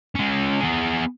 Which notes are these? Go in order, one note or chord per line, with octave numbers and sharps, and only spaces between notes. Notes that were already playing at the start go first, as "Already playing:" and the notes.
G#3 C#4
B3 G#4